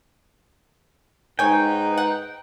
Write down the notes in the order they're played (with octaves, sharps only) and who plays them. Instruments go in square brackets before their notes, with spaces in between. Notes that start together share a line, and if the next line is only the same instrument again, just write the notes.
[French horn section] G#2 [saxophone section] D#4 B4 [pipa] C#5 G#5 [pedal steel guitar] G5
[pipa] F#5